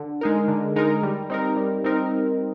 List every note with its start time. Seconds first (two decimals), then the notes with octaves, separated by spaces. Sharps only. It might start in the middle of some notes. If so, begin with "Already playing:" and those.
Already playing: D3
0.21 G#3 D#4 A#4
0.48 D3
0.76 G#3 D#4 A#4
1.03 G3
1.30 C4 D#4 A#4
1.57 G3
1.84 C4 D#4 A#4